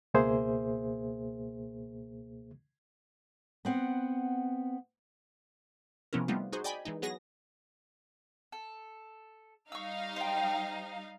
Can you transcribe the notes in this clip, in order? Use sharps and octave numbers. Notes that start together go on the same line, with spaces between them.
C#2 B2 A#3 G#4 C5 E5
B3 C4 F#5
C3 F3 B3 C#4 E4 A#4
G3 A3 B3 C4 D#4 F4
D#4 F#4 G#4 C5
D5 D#5 G5 G#5 B5
E3 G#3 D#4
F#3 B3 G#4 A#6
A4
G3 D#4 F5 C#6 E6
C5 G5